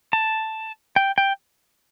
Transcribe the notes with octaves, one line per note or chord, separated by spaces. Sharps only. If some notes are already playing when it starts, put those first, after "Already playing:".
A5
G5
G5